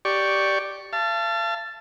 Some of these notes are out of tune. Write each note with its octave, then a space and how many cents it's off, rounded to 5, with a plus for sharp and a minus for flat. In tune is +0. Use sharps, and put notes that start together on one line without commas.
G4 -5 D5 +0 C#6 +0
F5 -45 A5 +0